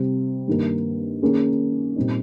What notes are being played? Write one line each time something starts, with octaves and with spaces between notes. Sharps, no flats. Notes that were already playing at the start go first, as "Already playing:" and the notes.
Already playing: C3 G3 C4
G2 D#3 A#3
D#3 A#3 C#4 G#4
A#2 G3 C4 D#4